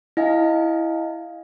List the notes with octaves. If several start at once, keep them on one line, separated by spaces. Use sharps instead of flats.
E4 D#5 F5 G#5